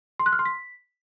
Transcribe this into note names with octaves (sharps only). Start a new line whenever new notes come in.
C6
F#6
F6
C6
B6